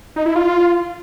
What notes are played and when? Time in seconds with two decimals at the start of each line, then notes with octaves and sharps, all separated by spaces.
0.16 D#4
0.26 E4
0.36 F4